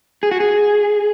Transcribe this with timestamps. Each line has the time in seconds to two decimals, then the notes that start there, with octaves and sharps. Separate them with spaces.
0.23 G#4
0.31 F#4
0.40 G#4